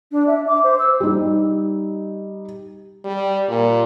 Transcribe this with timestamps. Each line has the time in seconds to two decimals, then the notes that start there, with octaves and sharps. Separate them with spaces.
0.12 D4
0.27 E5
0.48 D6
0.64 C5
0.79 E6
1.00 G3 D#4
3.04 G3
3.49 A#2